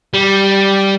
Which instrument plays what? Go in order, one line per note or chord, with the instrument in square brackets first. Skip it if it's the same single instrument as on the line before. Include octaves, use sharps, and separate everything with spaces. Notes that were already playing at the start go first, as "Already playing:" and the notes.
[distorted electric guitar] G3